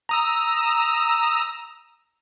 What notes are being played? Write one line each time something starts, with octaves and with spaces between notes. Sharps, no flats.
A#5 D#6 E6